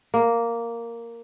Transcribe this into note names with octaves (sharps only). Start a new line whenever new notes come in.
A#3